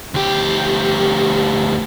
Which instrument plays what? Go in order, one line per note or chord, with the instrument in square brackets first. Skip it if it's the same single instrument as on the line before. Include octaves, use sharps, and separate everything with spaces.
[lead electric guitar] D2 G4